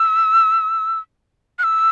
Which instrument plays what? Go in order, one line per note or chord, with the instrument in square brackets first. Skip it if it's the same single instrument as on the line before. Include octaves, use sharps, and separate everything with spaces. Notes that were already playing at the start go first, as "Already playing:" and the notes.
Already playing: [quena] E6
F#6
E6